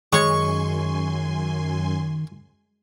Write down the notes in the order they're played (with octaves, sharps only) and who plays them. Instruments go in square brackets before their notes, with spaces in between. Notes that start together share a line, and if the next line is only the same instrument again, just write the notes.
[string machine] F#2 G#5 C6 [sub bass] D#3 [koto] G#3 C#5 [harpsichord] C#6